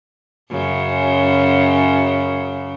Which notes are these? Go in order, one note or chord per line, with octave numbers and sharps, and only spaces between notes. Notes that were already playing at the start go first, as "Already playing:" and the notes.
F#2 C#3